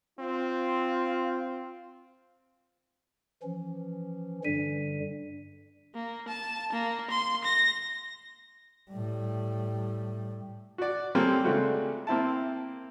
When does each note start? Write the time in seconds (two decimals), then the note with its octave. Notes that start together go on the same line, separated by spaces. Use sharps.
0.19 C4 F4
3.43 E3 F3 C#4
4.44 G2 D3 G3 D4 B6 D#7
5.95 A#3
6.28 A5
6.73 A#3
7.11 C6
7.44 A#6
8.90 A2 G3
10.78 F#4 D5
11.15 G3 A#3 C4 C#4 A4
11.44 C#3 G#3 A3 C4 D4 F#4
12.07 A#3 C4 E4 A5